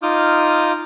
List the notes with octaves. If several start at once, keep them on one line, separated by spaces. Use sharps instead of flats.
D#4 F4 D6 D#6 F6 G6